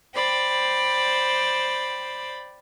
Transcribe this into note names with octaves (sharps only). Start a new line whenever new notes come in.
C5 D5 G5 B5